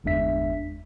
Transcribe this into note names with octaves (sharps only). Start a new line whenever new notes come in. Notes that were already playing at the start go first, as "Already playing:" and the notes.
G1 E2 G#3 D4 E5 B6